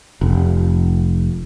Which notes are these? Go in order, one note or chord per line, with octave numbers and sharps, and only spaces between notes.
F1